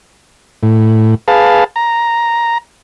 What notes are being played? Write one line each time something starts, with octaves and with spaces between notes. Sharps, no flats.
A2
G#4 B4 F5 A5
A#5